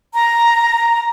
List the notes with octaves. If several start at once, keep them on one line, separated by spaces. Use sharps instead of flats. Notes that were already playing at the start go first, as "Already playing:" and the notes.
A#5